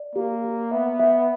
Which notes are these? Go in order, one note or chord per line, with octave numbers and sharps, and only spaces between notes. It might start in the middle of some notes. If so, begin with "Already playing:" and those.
Already playing: D5
A#3 G4
G4
B3 E5
E5